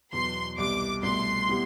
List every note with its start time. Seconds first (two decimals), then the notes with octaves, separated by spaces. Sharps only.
0.13 E2 B2 F#3 C6
0.58 C2 B2 G3 D6
1.03 C2 B2 A3 C6
1.49 B2 G3 B3 E4 G4